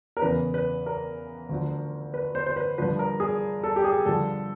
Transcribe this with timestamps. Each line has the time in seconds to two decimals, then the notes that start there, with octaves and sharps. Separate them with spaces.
0.17 A#4
0.22 E2 C#3 E3 B4
0.54 B4
0.86 A#4
1.49 D2 D3 F3
2.14 B4
2.35 C5
2.47 C5
2.56 B4
2.78 G2 D3 F3 B4
2.99 A#4
3.20 G#4
3.64 A4
3.76 G4
3.84 G#4
4.06 G2 D3 F3 A4